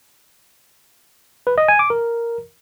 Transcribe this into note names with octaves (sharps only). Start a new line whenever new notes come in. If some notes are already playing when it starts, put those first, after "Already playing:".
B4
D#5
G#5
D6
A#4